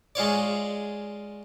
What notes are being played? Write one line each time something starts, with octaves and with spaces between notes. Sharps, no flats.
G#3 F4 C#5 D5